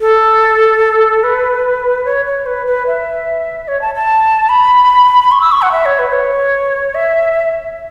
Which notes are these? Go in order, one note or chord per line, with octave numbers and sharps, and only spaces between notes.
A4
B4
C#5
C#5
B4
B4
E5
C#5
A5
A5
B5
C#6
E6
C#6
F#5
E5
C#5
B4
C#5
E5